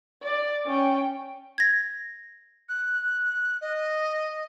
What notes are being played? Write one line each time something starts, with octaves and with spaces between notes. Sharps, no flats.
D5
C#4 G5
G#6 A#6
F#6
D#5